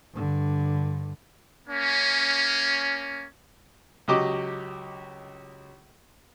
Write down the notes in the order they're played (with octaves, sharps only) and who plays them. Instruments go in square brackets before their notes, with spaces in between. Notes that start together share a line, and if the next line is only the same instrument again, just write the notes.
[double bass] G2 D3
[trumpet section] A#3 C#4
[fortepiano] C#2 F#3 F#4 G4 D#5 D6